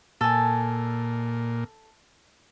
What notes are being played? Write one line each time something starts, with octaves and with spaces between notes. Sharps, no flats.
A#2 A4 G#5